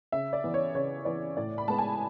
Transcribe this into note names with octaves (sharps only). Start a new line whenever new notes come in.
C#3 E5
D5
E3 B3
C#5
C#3 C#5
E3 B3 D5
A2 D5
B5
G#3 B3 A5
G#5